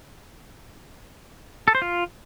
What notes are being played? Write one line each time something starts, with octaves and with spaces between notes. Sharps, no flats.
A4
C5
F4